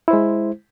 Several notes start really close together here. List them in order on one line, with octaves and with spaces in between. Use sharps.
E4 C5 G#3